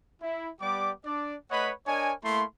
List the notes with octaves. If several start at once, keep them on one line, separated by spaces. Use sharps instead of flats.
E4
G3 B3 G4 D5 D6
D4 D5
A3 B4 C#5 D#5 F#5 B5
D4 A#4 C#5 D#5 G#5
A3 A#3 E4 C6